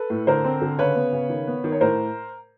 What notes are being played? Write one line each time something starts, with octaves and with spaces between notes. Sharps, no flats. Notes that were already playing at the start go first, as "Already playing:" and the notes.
Already playing: A4 B4
A2
D3 A#4 C5
C4
D3
C#3 B4 C#5
B3
C#3
D#3
B3
D#3
C#5
A2 A#4 C5